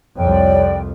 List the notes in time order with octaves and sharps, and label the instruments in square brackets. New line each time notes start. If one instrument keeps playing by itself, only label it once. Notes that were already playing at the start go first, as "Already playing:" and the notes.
[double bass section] C2 F2 [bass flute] C#5 [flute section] D5 G5